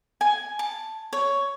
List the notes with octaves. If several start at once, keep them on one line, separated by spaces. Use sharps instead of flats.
G#5
A5
C#5